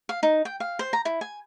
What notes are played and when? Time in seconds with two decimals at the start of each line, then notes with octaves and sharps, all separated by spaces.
0.09 F5
0.23 D#4
0.45 G5
0.60 F5
0.79 C5
0.93 A#5
1.05 E4
1.21 G#5